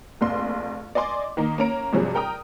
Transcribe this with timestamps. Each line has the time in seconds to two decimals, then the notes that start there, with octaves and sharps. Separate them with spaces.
0.21 F1 A#1 C6
0.95 D5 D#5 G#5 C6 D6
1.37 D#3 A#3 D#4
1.58 A#3 C#4 A#5 D7
1.93 G2 C3 F3 F#3 G#4
2.15 A#4 G5 A#5 D#6